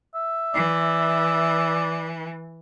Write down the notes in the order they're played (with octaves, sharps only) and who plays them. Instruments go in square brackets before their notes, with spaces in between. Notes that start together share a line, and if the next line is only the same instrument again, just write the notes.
[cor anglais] E5
[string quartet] E3 [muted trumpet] D5